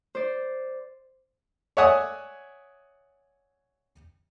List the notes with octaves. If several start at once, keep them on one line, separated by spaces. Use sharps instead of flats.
C5 D5
C#5 D5 E5 F#5 G#5 D#6